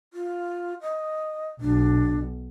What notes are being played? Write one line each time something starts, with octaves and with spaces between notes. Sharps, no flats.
F4
D#5
B1 B2 D4